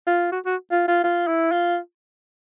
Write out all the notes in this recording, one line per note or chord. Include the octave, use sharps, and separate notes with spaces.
F4
F#4
F#4
F4
F4
F4
E4
F4